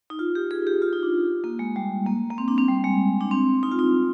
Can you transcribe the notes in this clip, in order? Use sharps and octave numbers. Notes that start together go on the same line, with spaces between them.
D#4
F4
G4
G#4
G4
F4
D#4
D4
A#3
G#3
G3
A#3
A#3
C4
D4
C4
G3
G#3
D4
C4
D#4
F4
D#4